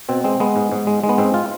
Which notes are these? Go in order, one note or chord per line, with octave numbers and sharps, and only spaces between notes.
B2 C4
G#3 C4
G#3 B3
G#2
G#2
G#3
G#3
B3
G#2 C4
F4